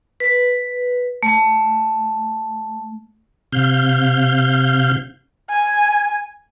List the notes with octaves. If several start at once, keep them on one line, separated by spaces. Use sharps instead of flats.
B4
A3
C3 F5 G6
G#5